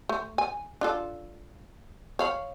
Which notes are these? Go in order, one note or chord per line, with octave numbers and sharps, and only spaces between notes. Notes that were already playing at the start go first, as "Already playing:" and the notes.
A3
G#5
D4 F4 A4
C#5 F5 B5